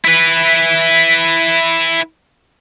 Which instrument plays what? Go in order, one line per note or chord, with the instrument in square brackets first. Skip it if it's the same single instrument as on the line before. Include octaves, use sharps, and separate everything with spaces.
[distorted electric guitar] E4 B4